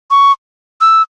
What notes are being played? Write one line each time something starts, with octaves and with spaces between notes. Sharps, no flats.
C#6
E6